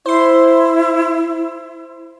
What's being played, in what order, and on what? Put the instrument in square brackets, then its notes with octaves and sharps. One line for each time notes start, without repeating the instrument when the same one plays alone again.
[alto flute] E4 [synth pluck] C5 C6